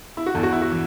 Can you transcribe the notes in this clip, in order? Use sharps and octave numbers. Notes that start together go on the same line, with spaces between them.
E4
F#4
E2 E3 A4
F#4
E4
F#4
E3